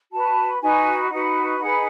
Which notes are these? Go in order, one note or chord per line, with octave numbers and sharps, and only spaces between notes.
F#4 B4 A5
D#4 F#4 B4 G#5
D#4 F#4 B4 F#5
D#4 G#4 B4 F#5